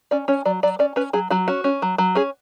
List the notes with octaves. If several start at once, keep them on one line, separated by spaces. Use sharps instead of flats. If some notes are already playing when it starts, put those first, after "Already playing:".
C#4 D5
C#4 C#5
F#3 D5
F#3 D5
C#4 D5
C#4 B4
F#3 G#4
F#3 F#4
C#4 F#4
C#4
F#3
F#3
C#4 G#4